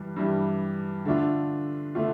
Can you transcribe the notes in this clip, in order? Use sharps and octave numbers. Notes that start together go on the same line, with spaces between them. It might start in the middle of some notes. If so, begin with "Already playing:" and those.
Already playing: G2 E3 G3
G2 E3 G3
D3 A3 D4 F4
D3 A3 D4 F4